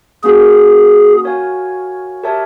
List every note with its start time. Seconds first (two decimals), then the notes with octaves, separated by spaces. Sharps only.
0.24 A#3 C#4 F#4 G#4 A#4
1.24 F#4 A#4 C#5 F5 G#5
2.24 G4 A#4 C#5 E5 A5